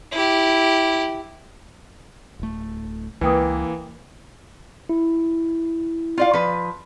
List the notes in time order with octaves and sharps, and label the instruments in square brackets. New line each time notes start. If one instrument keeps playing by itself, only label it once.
[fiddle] E4 G4
[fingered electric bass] D1 A3
[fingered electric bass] C#2 [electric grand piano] E3 A#3 [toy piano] B4 G5 D#6
[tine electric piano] E4
[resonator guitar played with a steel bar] F4 D5 F5
F3 B4